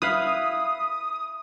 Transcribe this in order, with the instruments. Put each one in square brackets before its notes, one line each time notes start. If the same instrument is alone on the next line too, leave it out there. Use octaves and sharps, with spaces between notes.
[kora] E4 B4 F5 [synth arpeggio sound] D#6